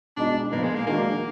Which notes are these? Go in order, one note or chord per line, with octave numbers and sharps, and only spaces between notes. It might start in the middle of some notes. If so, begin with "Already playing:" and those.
B2 G#3 D4 D#4 F#4
A#2 F3 A#3 B3 D#4
G#3
A#3
D#3 G#3 A#3 D4 F#4